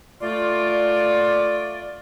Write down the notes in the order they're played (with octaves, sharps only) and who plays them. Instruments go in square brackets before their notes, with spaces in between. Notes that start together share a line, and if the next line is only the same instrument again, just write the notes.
[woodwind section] A3 F4 D5